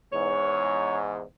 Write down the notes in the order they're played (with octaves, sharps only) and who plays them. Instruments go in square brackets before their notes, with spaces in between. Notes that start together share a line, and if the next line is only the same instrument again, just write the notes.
[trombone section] E2 G#2 [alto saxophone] C#5